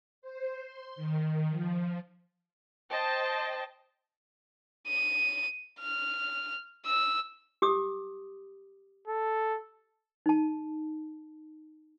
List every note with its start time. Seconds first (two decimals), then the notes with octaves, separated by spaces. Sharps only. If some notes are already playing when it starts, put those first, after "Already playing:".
0.22 C5
0.63 C6
0.96 D#3
1.49 F3
2.90 C5 D#5 G5 A5
4.88 D#7
5.80 F6
6.86 E6
7.62 G4 D6 D#6
9.08 A4
10.26 D#4 A5